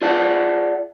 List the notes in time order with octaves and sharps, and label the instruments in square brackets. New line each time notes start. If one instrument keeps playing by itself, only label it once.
[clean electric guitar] F4 G#4 D5 E5 F#5 A5